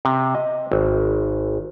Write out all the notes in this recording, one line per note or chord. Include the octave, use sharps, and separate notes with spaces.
C3
D#5
G#1